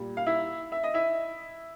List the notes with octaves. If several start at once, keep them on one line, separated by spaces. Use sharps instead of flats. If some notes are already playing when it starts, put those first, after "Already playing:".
Already playing: A#2 G3
F5
E4 E5
E5
D#5
E4 E5